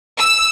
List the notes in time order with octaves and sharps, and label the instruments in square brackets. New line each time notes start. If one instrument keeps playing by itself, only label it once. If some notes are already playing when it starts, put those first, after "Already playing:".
[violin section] E6